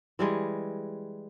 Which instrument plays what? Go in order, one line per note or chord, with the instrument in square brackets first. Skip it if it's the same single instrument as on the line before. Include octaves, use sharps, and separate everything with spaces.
[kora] E3 G3 G#3